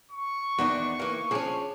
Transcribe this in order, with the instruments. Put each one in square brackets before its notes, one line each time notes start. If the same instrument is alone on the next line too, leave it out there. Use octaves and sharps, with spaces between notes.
[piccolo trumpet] C#6
[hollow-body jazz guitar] E2 D#3 D4 [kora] F#4
[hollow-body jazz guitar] E3 A#3
[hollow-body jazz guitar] F3 C#4 [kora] D4 G#4